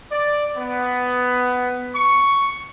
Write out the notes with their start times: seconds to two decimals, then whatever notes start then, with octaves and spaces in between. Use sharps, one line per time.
0.11 D5
0.57 B3
1.96 C#6